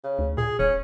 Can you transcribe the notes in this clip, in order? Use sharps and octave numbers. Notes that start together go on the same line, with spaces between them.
C#3
D2
A#2 G#4
D#1 C#4